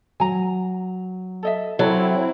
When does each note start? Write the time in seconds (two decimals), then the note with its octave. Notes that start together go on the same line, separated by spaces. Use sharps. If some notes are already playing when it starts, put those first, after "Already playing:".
0.20 F#3 G#5 A#5
1.43 A4 D#5 E5
1.79 F#3 C4 E4 A4